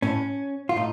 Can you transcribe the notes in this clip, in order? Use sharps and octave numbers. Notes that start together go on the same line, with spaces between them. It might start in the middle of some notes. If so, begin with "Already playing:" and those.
A2 C#4
F4
A2 D#4